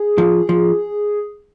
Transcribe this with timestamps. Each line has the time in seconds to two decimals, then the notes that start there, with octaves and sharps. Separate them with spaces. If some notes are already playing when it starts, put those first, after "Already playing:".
Already playing: G#4
0.18 F3
0.49 F3